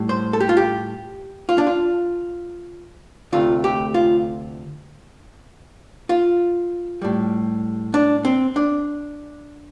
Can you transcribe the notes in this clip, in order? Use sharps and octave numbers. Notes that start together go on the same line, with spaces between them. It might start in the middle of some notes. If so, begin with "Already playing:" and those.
Already playing: A2 G3
C5
A4
G4
F4
G4
F4
D4
F4
D2 C3 A3 F4
G4
F4
F4
A2 G3
D4
C4
D4